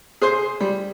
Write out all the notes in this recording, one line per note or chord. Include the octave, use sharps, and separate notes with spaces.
G#4 C5 C6
G3